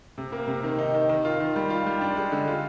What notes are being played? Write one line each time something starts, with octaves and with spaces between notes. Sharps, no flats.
C3
A#3
C3
D#3
D#4
D#3
D#3
F4
D#3
G3
F4
G3
D4
G#3
D3
F4